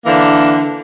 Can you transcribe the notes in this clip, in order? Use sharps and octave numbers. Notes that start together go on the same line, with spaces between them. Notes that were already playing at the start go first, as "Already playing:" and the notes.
D3 E3 A#3 D4